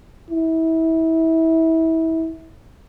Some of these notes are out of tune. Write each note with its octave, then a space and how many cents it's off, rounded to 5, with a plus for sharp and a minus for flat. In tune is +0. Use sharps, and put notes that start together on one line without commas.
E4 -25